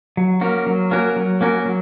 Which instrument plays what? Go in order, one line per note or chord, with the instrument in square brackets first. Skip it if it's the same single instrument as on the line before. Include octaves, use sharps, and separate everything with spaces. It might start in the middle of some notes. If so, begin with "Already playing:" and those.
[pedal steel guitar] F#3
A#3 C#4 F#4 A#4
F#3
A#3 C#4 F#4 A#4
F#3
A#3 C#4 F#4 A#4
F#3